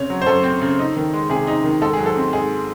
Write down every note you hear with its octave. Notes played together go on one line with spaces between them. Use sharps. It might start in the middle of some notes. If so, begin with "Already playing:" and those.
Already playing: C#3 C4 C#5
F#3
C5
F#2 A4
C4
C#3
D#4
D#3
G#3
C3 G#4
D#4
D#3
G#2 A4
G#4
F#3
A4
C4
G#2 G#4